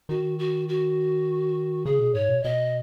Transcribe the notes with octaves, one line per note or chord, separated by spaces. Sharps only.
D#3 F#4
F#4
F#4
C#3 G#4
B2
G#2 C#5
B2
B2 D#5